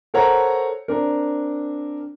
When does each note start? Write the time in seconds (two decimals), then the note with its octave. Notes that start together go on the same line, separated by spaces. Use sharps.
0.14 A4 A#4 C5 C#5 F#5 A#5
0.88 C4 D4 A#4